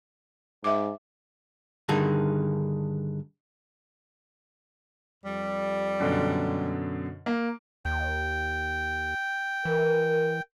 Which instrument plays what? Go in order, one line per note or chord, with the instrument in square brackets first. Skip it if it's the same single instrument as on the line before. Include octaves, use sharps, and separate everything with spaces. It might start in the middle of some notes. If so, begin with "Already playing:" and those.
[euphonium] G#2 [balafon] E5 D6
[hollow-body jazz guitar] G2 D3 D#3 D#4 G#4
[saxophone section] F2 G3
[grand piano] F#2 B2 D3
A#3
[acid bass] D#2 [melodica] G5
[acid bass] E3 [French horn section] A#4